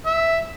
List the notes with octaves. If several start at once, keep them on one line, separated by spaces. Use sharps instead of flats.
E5